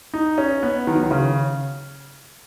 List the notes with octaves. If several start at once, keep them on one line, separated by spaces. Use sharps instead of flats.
D#4
C#4
B3
D#3
F#3
D#3
C#3